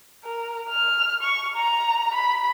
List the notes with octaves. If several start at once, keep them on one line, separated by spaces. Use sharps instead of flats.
A#4
F6
C#6
A#5
B5